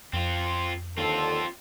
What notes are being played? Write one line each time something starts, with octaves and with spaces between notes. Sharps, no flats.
F2 C4 F4
D#2 D3 C4 F4 A4